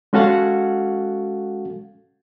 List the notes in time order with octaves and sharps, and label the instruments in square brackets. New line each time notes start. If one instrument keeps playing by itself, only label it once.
[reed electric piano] G#3 C#4 F#4 A4 F5 F#5